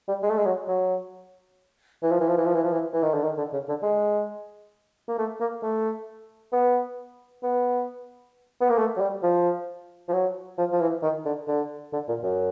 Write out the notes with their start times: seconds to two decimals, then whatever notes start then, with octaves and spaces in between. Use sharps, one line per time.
0.08 G3
0.23 G#3
0.30 A3
0.38 G#3
0.45 F#3
0.68 F#3
2.03 E3
2.12 F3
2.21 E3
2.29 F3
2.38 E3
2.46 F3
2.55 E3
2.64 F3
2.73 E3
2.93 E3
3.03 D#3
3.14 D3
3.24 D#3
3.38 D3
3.53 C#3
3.68 D3
3.83 G#3
5.08 A#3
5.18 A3
5.40 A#3
5.63 A3
6.53 B3
7.43 B3
8.61 B3
8.70 A#3
8.78 A3
8.97 F#3
9.01 G3
9.23 F3
10.08 F3
10.13 F#3
10.58 F3
10.72 F3
10.81 E3
11.02 D#3
11.26 D3
11.48 D3
11.93 D3
12.08 A#2
12.23 F#2